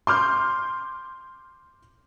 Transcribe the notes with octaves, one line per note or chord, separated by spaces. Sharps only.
C6 D6 F6 G6